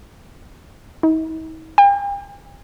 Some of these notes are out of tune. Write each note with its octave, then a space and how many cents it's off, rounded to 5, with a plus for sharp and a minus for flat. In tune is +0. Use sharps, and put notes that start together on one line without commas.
D#4 +45
G5 +45